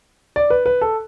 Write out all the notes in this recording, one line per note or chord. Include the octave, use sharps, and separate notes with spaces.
D5
B4
B4
A4